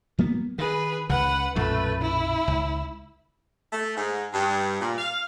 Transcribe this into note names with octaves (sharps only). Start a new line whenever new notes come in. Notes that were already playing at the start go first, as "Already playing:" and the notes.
F#3 A#3 B3
D#3 G#4 B4
C#2 C#3 B4 F#5
B1 F#2 A#2 A3 B4
E4
C#2
A3
G#2
G2
A#2
F5